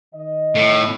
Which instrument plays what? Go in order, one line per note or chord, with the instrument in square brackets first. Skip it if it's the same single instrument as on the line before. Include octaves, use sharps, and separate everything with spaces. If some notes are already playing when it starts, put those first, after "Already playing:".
[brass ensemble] D#3 D#5
[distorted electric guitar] A2